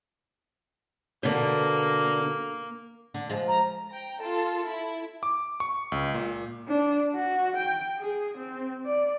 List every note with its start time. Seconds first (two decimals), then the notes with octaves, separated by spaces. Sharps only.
1.23 B2 D3 A#3
3.14 D3
3.29 F3 G#3
3.48 A#5
3.89 G5 A#5
4.20 F4 A4
4.65 E4
5.23 D6
5.60 C#6
5.92 C#2
6.14 A#2
6.68 D4
7.15 F#4
7.56 G5
7.99 G#4
8.37 C4
8.85 D5